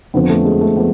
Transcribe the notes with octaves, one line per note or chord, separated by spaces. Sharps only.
F2 D3 F3 B3
A3
G#3
A3
F3 B3